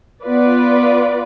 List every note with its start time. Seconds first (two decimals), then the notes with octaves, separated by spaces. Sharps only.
0.22 B3 F4 B4 D5